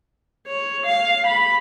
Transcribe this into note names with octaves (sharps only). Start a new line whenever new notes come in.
C#5
F5
B5